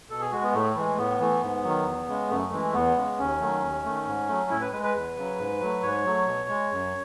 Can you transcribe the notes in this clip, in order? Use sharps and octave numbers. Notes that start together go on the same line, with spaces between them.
B2 A4
G#4
G#3 F#4
B3
A2 A3
E3 G#3
A2 B3
E3 A3
G#2
D#3 F#3
E2
C#3 G#3
F#2 A3
E3 G#3
E2 B3
C#3 G#3
D#2 C#4
D#3 F#3 A3
D#2
D#3 A3
G#2
F#3 A3
A2 E4
B4
G#3 B4
B4
E2
C#3 F#3
G#2
F#3 A3
G#2 C#5
F#3 A3
B2
G#3
F#2